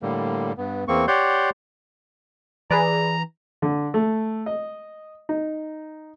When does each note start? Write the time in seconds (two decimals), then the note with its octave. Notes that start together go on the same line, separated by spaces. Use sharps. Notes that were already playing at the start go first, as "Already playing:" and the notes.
0.02 A2 D3 G3 A#3
0.58 G2 B3
0.88 E2 A#3 C4 C#6
1.08 G4 C#5 D5 F#5 C6 G6
2.70 E3 G#4 B4 D5 A#5
3.62 D3
3.94 A3
4.46 D#5
5.29 D#4